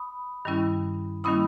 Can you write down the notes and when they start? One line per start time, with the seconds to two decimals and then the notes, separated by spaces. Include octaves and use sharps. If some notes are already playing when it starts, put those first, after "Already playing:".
Already playing: B5 D#6
0.45 G2 D#3 G3 C#4 E4
1.24 D#3 G3 A#3 C#4 E4 B5 D#6